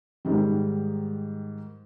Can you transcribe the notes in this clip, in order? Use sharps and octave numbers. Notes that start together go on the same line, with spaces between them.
G#2 D#3 G3